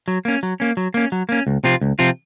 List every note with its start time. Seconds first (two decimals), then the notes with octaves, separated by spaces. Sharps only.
0.08 F#3
0.25 A#3 C#4
0.43 F#3
0.60 A#3 C#4
0.77 F#3
0.94 A#3 C#4
1.12 F#3
1.29 A#3 C#4
1.47 C#2
1.64 C3 F3 C4 F4
1.81 C#2
1.99 C3 F3 C4 F4